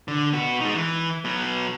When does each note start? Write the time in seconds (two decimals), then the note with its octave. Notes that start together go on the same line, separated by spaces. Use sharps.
0.08 D3
0.33 B3 F#4
0.61 G#3 D#4
0.75 E3
1.25 F#3 B3